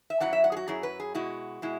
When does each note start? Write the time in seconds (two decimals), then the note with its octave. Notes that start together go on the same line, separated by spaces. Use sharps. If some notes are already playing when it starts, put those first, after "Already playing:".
0.10 E5
0.20 F#2 F#3 E4 F#5
0.33 E5
0.44 F#5
0.52 G#4
0.57 F#4
0.68 F#2 F#3 E4 G#4
0.83 B4
1.00 G#4
1.15 B2 G#3 E4 F#4
1.62 B2 G#3 E4